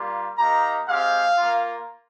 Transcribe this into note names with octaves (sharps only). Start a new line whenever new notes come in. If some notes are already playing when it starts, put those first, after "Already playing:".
Already playing: G3 A#3 F4
A#3 D#4 G4 A#5
G#3 C4 G4 F5
A#3 F4